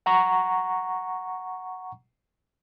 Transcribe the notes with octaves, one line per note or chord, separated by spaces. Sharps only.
F#5 A#5 C#6